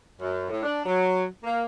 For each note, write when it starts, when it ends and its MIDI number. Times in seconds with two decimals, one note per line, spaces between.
0.20 0.47 42
0.50 0.62 45
0.63 0.81 62
0.85 1.24 54
1.44 1.65 58